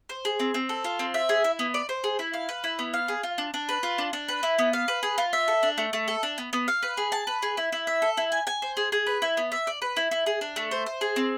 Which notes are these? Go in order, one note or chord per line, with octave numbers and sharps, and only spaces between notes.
C5
G#4
C4
C4
A4
F4
C4
E5
G#4
E4
B3
D5
C5
G#4
E4
F5
B4
E4
B3
F5
G#4
F4
D4
D4
B4
F4
D4
D4
B4
E4
B3
F5
B4
G#4
F4
E5
A4
D4
A3
A3
A4
D4
B3
B3
F5
B4
G#4
A5
B4
G#4
E4
E4
E5
A4
E4
G#5
G#5
C5
G#4
G#4
B4
E4
B3
E5
D5
B4
E4
E4
G#4
D4
A3
C5
C5
G#4
C4